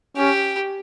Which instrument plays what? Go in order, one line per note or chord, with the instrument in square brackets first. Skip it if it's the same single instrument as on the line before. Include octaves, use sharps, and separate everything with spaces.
[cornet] C#4 [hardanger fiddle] G4